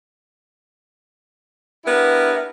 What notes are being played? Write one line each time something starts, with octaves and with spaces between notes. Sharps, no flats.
B3 D4 E4 G4 A#4